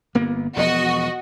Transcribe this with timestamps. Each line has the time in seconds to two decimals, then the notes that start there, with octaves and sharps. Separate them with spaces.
0.15 G1 A#3 B3
0.57 E1 F3 B3 F#4 D#5